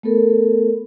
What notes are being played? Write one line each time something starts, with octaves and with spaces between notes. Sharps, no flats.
A3 B3 A4 A#4